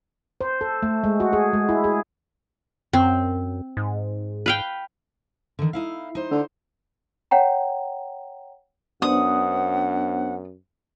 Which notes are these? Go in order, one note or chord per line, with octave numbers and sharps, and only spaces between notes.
C5
A4
A3
G#3
F#4
G#4
G#3
E4
G#4
F#2 C4
G#2
B4 F5 G5
D3 D#3
D#4 E4 F5
D#4 C5
D3
C#5 F#5 G5 A#5
F#2 B3 D4 C5 F#5 D#6